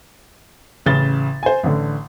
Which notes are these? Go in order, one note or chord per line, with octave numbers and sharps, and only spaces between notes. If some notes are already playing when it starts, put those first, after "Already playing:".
A1 C#3 A6 G7
C5 G#5
A1 D3